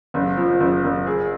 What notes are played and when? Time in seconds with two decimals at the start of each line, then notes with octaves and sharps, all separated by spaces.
0.14 F#1
0.37 F3
0.60 F#1
0.84 F#1
1.07 G#4